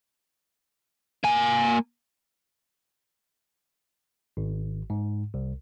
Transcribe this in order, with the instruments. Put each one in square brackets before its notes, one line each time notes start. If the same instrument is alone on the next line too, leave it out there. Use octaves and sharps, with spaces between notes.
[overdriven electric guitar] A#3 G#5
[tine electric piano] G#1
G#2
C2